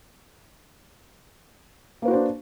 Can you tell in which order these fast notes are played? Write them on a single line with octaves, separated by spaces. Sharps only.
A#3 B4 F#4 C5 D4